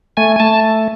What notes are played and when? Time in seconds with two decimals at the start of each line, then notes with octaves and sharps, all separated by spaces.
0.17 A3 G#5
0.36 G#5
0.40 A3 A5